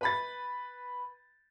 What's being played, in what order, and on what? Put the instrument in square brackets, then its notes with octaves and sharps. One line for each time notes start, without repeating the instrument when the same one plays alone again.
[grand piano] B4 B5 A6